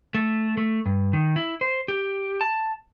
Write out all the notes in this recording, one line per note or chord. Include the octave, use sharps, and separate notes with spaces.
A3
A3
G2
D#3
E4
C5
G4
A5